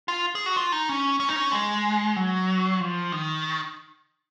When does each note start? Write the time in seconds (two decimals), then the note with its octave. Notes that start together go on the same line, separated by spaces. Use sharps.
0.08 F4
0.35 G#4
0.46 F#4
0.56 F4
0.72 D#4
0.89 C#4
1.20 C#4
1.29 D#4
1.36 C#4
1.52 G#3
2.16 F#3
2.80 F3
3.12 D#3